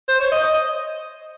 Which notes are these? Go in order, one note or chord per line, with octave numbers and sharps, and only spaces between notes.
C5
C#5
D#5
D#5
D#5